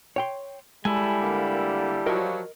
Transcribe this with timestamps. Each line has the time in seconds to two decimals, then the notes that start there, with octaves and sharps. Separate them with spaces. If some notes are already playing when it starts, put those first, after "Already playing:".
0.16 C#5 G5 C6
0.85 G3 G#3 E4 A4 G#5
1.21 D3 A#3
2.06 F3 F#3 A#4 D#5